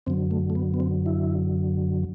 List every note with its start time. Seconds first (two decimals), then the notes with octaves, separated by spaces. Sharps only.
0.06 F#2 D3 F#3 C4
0.31 A3
0.50 A3
0.55 B3
0.74 B3
0.80 C4
1.06 E4